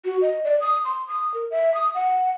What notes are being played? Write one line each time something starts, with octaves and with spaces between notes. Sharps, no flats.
F#4
D#5
D5
D#6
C6
D#6
A#4
E5
D#6
F#5